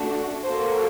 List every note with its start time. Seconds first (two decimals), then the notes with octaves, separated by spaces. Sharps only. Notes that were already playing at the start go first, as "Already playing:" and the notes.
Already playing: A3 D4 F#4
0.42 A#3 F#4 A4 C5